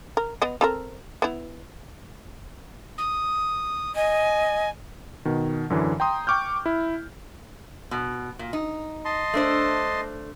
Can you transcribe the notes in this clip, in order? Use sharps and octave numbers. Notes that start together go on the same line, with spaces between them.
A#4
B3 D#5
C4 A4 A#4
B3 E4
D#6
D#5 G#5
B2 D#3
F#2 D3 E3
G5 A#5 C6 D#6
G5 C#6 D6 F6 G6
E4
B2
A#2
D#4
D#5 A5 C6
A3 D4 C5